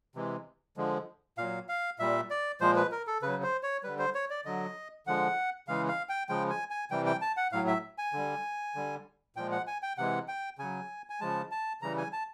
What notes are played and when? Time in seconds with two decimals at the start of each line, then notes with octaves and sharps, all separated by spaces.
0.15 C3 E3 G#3
0.77 D3 F3 G#3
1.38 A#2 F#3 F5
1.69 F5
1.99 A#2 G3 E5
2.30 D5
2.61 A#2 F3 G#3 C5
2.76 B4
2.92 A#4
3.07 A4
3.22 C#3 F#3 B4
3.43 C5
3.63 C#5
3.83 D3 G3 B4
3.99 C5
4.15 C#5
4.30 D5
4.45 D3 F#3 D#5
5.07 D3 F3 G#3 F#5
5.68 C#3 E3 G#3 F5
5.88 F5
6.09 G5
6.29 C#3 F3 G#3 G5
6.50 G#5
6.70 G#5
6.91 C3 E3 G3 G5
7.06 G5
7.21 A5
7.37 F#5
7.52 A2 F#3 F5
7.67 E5
7.98 G#5
8.13 D3 G3
8.75 D3 G3
9.36 A#2 F3 G#3 G5
9.51 F#5
9.67 G#5
9.82 G5
9.98 C3 E3 G#3 F#5
10.28 G5
10.59 C#3 F#3 G#5
11.10 G#5
11.21 C#3 F3 G#3 A5
11.51 A5
11.82 C#3 E3 G3 A#5
11.98 G#5
12.13 A5